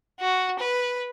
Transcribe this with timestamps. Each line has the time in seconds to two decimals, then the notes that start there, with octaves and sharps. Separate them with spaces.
0.20 F#4
0.59 B4